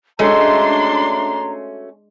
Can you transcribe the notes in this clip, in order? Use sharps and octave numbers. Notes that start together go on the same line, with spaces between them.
G#3 A3 C#4 D4 F#4 A#5 C6